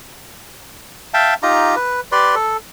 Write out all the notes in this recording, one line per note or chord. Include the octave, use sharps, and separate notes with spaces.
E5 F5 G5 A5
D#4 F4 G4 A#5
B4
G4 B4 D5 C6
A4